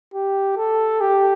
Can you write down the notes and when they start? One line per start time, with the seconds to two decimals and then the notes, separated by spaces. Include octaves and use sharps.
0.14 G4
0.57 A4
1.01 G4